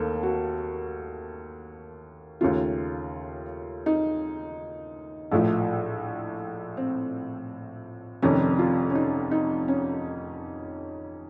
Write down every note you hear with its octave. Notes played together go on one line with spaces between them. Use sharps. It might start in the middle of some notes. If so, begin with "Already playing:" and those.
Already playing: D#2 A3 A#3 A4
F#4
D#2 C#3 A3 F4
D#4
A#1 A2 F3 A3
C4
F1 F2 D#3 C#4
F4
C#4
D#4
D#4
C#4